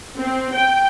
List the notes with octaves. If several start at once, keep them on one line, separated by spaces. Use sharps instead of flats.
C4
G5